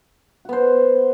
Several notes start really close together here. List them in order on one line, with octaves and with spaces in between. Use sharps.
F#4 B3 C5